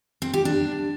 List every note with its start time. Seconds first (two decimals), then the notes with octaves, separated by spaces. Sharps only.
0.22 C4
0.34 G4
0.45 D4